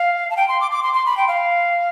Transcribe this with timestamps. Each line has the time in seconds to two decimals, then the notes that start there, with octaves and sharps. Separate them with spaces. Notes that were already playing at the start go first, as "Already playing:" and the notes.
Already playing: F5
0.30 A5
0.37 G5
0.48 C6
0.60 D6
0.71 D6
0.83 C6
0.94 C6
1.06 B5
1.17 G5
1.28 F5